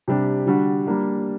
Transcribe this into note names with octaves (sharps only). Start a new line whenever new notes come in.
C3 G3 D4 G4
D3 G3 D4 F#4
G3 A#3 D4